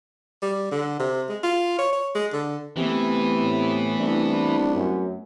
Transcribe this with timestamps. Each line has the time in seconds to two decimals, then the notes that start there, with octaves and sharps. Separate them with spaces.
0.42 G3
0.72 D3
0.99 C3
1.29 G#3
1.43 F4
1.79 C#5
1.93 C#5
2.15 G#3
2.33 D3
2.77 C3 E3 A3 B3
3.40 A2
3.99 C2 D4
4.75 F#2